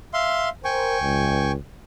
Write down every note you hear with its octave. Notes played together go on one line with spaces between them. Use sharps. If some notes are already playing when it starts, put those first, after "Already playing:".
E5 F5 C6
A#4 C5 G5 G#5 C#6
C#2